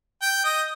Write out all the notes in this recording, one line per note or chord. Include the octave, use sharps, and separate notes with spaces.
G5
D#5